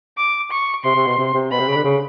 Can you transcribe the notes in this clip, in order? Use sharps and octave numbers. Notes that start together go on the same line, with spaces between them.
D6
C#6
C3 C6
C3
B2
C3
C3
B2 B5
C3
C#3
D3
C#3